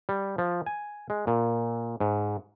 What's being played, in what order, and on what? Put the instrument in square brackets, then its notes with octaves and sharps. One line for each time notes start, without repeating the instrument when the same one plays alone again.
[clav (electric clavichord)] G3
F3
G#5
G#3
A#2
G#2